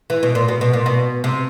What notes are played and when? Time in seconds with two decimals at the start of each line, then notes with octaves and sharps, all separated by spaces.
0.10 E3
0.23 B2
0.35 A#2
0.48 B2
0.61 B2
0.73 A#2
0.86 B2
1.24 C3